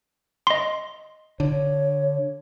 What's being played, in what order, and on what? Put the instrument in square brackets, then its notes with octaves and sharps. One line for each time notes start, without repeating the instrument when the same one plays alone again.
[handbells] D#5 C6
[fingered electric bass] D3 [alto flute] C#5